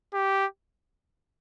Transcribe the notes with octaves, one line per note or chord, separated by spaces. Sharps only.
G4